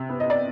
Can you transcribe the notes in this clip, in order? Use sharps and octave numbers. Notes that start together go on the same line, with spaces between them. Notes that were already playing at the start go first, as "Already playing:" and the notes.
Already playing: C3
B3
D#5
D5